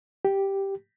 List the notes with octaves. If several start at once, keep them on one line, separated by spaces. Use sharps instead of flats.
G4